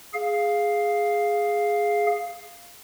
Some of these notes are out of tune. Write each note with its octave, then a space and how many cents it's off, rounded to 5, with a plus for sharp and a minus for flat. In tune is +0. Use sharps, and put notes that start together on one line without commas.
G#4 +0 F5 +0